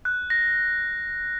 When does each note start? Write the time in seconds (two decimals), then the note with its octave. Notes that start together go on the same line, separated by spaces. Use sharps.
0.05 F#6
0.30 A#6